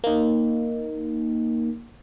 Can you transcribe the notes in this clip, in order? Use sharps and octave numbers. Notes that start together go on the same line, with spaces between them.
A#3 D#4